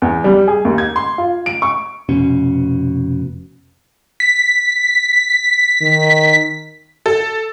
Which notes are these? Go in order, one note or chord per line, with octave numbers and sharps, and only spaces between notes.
E2
G3
G#4
D#2
G#6
C6
F4
D7
C#6
F1 B2 C#4
B6
D#3
A4